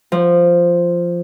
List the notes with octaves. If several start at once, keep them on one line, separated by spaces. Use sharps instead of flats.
F3